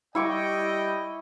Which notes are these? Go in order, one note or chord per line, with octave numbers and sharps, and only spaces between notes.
G3 E4 D#5 G5 C#6 D6